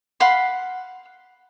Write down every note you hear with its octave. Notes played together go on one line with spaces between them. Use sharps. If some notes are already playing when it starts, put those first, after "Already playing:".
F5 F#5 B5 C6